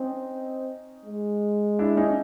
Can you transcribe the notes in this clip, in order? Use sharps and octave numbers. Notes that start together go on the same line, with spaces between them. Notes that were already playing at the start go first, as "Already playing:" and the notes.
Already playing: C4 C#4 D#4
G#3
D4 E4
C#4 D#4